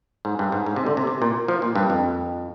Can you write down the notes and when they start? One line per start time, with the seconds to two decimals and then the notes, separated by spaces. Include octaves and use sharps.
0.25 G#2
0.39 G2
0.52 G#2
0.66 G#2
0.76 C3
0.86 D3
0.97 C3
1.07 C3
1.22 A#2
1.48 F3
1.62 A#2
1.75 G2
1.90 F2